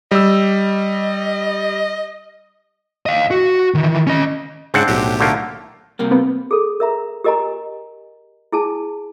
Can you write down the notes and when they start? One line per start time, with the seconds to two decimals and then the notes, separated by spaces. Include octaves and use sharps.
0.11 G3 D#5 E6
3.06 D#5 F5
3.31 F#4
3.74 D#3 E3
4.07 C#4 D#5
4.74 G#2 C#3 C4 D4 F#5
4.88 B1 A2 G4
5.20 D3 A3 A#3
5.99 C3 G3 A#3
6.11 B3 C4
6.51 G#4 A4
6.80 A#4 E5 A#5
7.24 G4 A#4 D#5 G#5 A#5
8.52 E4 G#4 G#5 A5